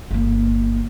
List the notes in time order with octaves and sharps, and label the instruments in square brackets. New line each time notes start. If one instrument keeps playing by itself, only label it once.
[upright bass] G1 A#3